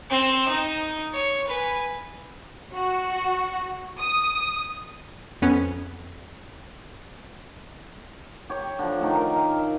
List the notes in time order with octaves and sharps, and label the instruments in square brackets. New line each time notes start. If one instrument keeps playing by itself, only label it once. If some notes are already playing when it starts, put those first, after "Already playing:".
[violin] C4 E7
D#4
C#5
B4 G#5
[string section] F#4
D#6
[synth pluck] F2 B3 C#4
[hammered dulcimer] G4 C#5
D3 F3
D#3 A3
A#4
F5
E5